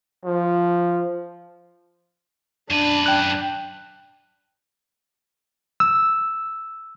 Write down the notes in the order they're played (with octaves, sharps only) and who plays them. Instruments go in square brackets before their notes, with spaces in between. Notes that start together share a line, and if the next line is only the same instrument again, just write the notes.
[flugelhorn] F3
[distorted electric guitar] F#2 B4 [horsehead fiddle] D4
[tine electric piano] G5 F#6
[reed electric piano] E6